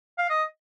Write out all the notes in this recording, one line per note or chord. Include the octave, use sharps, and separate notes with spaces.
F5
D#5